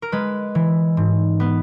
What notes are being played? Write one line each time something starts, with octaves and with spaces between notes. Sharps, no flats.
A#4
G#3 B4
E3
G#2
B3